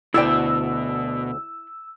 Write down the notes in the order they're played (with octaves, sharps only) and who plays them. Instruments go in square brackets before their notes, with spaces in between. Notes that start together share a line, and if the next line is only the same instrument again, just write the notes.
[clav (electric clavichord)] D2 D3 [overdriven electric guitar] B2 [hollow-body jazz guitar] E4 D5 G5 [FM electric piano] E6